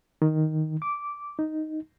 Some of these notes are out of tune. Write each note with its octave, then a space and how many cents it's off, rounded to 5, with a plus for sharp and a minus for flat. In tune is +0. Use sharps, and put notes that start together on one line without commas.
D#3 +5
D6 -10
D#4 +0